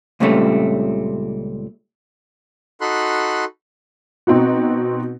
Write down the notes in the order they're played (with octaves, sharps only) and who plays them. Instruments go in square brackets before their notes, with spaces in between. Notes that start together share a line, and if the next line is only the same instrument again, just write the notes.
[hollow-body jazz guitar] C#2 A#2 C#3 G3 A3 C4
[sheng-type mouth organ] D#4 F#4 A4 B5 C6 F#6
[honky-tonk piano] B2 C4 D#4 F#4